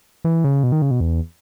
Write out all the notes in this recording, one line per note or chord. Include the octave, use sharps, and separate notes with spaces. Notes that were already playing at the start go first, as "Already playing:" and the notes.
E3
C#3
B2
D#3
C#3
B2
E2